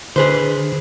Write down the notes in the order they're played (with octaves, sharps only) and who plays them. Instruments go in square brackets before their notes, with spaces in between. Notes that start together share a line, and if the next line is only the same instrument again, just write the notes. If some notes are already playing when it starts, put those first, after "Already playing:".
[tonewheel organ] D3 [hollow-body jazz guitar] G#4 B4 C5